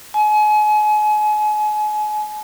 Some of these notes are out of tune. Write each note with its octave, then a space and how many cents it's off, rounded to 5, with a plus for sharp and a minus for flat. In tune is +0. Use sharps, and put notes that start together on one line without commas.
G#5 +35